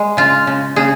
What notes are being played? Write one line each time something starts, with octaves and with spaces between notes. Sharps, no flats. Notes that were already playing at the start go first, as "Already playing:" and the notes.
Already playing: G#3
C#3 F4
C#3
C#3 G#4